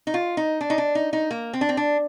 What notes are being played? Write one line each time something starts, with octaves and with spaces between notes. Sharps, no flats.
D#4
F4
D#4
D4
D#4
D4
D#4
D#4
A#3
C4
D4
C4
D4